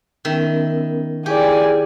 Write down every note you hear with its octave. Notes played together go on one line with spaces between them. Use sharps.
D#3 B3 C#4 A#4 E5
E4 G4 G#4 D5 G#5